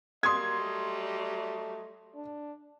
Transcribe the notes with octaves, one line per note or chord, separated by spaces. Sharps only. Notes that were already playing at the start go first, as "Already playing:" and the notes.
F#3 G3 A#3 D#5 C6 D#6 G#6
A3
D4